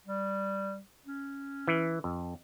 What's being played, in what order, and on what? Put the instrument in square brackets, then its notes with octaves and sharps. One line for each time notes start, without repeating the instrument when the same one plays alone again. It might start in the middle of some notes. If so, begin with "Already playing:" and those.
[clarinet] G3
C#4
[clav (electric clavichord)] E3
F2